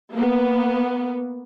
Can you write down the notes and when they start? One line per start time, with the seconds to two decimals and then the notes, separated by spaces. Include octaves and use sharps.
0.12 A#3 B3